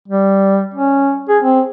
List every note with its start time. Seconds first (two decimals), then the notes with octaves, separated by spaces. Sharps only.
0.08 G3
0.74 C#4
1.29 G#4
1.42 C4